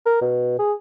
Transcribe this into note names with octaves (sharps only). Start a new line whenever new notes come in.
A#4
B2
G#4